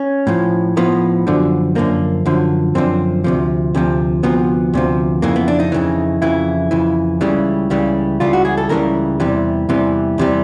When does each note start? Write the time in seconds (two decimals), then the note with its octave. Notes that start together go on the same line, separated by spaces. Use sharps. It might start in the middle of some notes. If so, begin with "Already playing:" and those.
Already playing: C#4
0.27 A2 F3
0.77 A2 F3 B3
1.27 F#2 D3 F3
1.75 F#2 D3 F3 A#3
2.26 F#2 D3 F3
2.75 F#2 D3 F3 C4
3.24 D2 C3 F3
3.75 D2 C3 F3
4.23 D2 C3 F3 B3
4.74 D2 C3 F3
5.22 F2 C#3 E3 A#3
5.36 B3
5.48 D4
5.60 D#4
5.72 F2 C#3 E3
6.22 F2 C#3 E3 E4
6.71 F2 C#3 E3
7.21 C#2 C#3 E3 G3
7.70 C#2 C#3 E3 G3
8.20 C#2 C#3 E3 G3 F4
8.33 F#4
8.45 G#4
8.58 A4
8.69 C#2 C#3 E3 G3 A#4
9.20 E2 C3 E3 G3
9.69 E2 C3 E3 G3
10.18 E2 C3 E3 G3